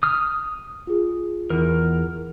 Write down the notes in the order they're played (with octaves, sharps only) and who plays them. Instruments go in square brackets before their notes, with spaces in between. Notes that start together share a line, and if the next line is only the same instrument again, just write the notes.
[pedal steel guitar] D#6 F6
[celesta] F4 G#4
[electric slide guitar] E2 [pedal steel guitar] A#4